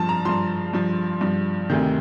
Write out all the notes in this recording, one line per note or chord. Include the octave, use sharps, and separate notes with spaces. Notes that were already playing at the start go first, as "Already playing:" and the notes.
Already playing: G2 F3 A5
A#5
G2 F3 C6
G2 F3
G2 F3
D2 C3 D#3